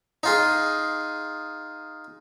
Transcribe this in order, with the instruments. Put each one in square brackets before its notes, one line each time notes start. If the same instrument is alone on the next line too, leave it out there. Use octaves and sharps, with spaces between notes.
[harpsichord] D#4 F4 G#4